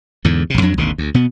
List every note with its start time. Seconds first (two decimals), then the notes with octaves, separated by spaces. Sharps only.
0.25 E2 G#2 D3
0.50 A#1 C3
0.62 F2 F#3 D4
0.77 G#1 D#2 B2 D3
0.98 D2
1.14 B2 B3